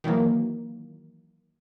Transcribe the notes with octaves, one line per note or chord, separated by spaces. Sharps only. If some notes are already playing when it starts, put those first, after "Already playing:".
D#3 E3 F#3 A#3